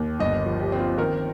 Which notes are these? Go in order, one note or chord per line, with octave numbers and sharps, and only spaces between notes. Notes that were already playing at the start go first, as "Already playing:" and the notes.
Already playing: D#2
G1 D#5
F3
G4
C4
F4
D#3 A#4